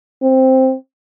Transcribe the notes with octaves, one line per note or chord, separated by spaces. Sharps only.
C4